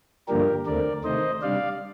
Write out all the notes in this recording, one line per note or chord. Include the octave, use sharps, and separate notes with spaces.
G2 D3 F3 A#3 D4 G4 A#4
D#2 D3 A3 C4 A#4 D5
C3 D#3 A3 C5 D#5
C3 G3 D4 D5 F5